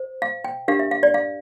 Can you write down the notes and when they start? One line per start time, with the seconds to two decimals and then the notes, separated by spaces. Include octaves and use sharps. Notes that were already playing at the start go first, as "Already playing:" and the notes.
Already playing: C5
0.22 F5
0.44 G5
0.68 D4 G4 A#4 F5
0.79 E5
0.91 F5
1.03 D5
1.14 F5